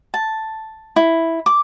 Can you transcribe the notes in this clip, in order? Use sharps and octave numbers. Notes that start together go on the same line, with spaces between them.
A5
E4
D6